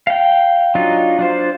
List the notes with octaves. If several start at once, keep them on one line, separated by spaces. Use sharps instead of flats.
F5 G5
F#3 D4 D#4 F4
D4 F4 C5